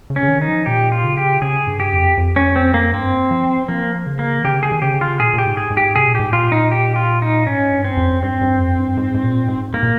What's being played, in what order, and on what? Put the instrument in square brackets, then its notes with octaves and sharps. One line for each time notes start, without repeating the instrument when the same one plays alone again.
[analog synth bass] C#3
[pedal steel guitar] C#4
[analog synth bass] C#3
D#3
[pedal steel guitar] D#4
[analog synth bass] F3
[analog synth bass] A#2 [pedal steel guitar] G4
[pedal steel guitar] F4
[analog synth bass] C#3
[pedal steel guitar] G4
[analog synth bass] C#3 [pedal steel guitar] G#4
[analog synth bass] G2
[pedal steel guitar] G4
[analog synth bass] F2
F2
[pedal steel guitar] C#4
C4
A#3
[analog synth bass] G2 [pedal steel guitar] C4
[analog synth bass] F3
[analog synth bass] F3 [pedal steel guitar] A#3
[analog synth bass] C#3
[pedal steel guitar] A#3
[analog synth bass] D#3
[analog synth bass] C#3 [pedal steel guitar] G4
[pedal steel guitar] G#4
[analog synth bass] D#3
[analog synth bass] C#3 [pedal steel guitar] G4
[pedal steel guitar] F4
[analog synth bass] A#2 [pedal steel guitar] G#4
[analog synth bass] A#2 [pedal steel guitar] G4
[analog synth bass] G#2
[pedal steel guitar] G#4
[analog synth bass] G#2
[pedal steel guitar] G4
[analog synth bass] C3 [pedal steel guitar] G#4
[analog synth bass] A#2
[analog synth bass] G#2 [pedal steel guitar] G4
[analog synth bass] A#2 [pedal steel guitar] F4
[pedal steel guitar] D#4
G4
F4
D#4
[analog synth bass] G#2 [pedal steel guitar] C#4
[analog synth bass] G2
[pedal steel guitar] C4
[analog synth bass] F2
[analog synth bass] G2 [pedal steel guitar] C4
[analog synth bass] G2
F2
G2
G#2
G#2
A#2
G#2
[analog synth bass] G#2 [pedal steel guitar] A#3
[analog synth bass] A#2